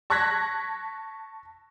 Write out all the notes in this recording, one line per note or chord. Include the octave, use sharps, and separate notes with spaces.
A5 C#6 F#6 G#6 A#6 B6